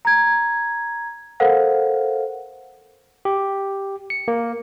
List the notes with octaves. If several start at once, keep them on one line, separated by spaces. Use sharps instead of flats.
A#5 G#6
A4 A#4 C5 F5 F#5
G4
C#7
A#3